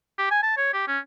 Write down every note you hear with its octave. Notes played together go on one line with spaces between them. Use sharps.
G4
G#5
A5
C#5
G4
C#4